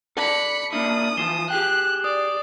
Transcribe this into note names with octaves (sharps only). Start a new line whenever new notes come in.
A4 D5 B5 C#7
A#3 D4 E4 D#6
E3 F3 F4 C7 E7 G7
G4 G#4 G5 F#6
D5 D#6